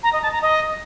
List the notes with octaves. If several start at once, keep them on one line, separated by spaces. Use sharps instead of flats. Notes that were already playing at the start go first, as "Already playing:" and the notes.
A#5
D#5
A5
A#5
D#5